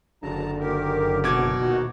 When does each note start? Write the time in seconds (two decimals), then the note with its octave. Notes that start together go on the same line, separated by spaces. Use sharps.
0.23 F#1 D3 A5 A#5
0.60 D#3 G4 A#4
1.24 B2 F#3 D6 G#6
1.60 D#1 D#4 F#4